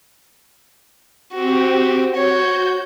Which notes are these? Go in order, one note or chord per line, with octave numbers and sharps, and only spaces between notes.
C4 F#4 G4
F#4 C#5 G6